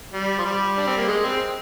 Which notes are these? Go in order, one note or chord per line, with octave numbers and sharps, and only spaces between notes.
G3
F3
G3
D4
C4
A#3
G#3
C4